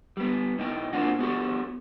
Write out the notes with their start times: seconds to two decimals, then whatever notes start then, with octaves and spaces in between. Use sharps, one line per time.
0.17 G3 B3
0.58 A2 D#4 G5
0.93 A#2 A#3 C4 D4 F4 F#4
1.19 B3 F#4 G4 A4